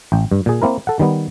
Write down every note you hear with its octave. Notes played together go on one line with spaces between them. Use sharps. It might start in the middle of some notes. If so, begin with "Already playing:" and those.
A1 G5
G2
A#2 G#4
A#3 C4 E4 A#4
A4 F#5
D#3 G3 B3